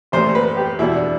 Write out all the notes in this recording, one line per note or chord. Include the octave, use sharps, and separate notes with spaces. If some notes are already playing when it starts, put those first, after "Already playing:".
A1 A2 G3 C5
B4
G4
E2 B2 G3 E4
D4